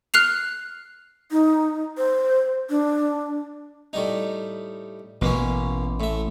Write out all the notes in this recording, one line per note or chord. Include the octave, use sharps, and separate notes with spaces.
F6 F#6 C7 F7
D#4
C5
D4
A2 G3 D#4
A1 B2 A#3 C#4
A2 E5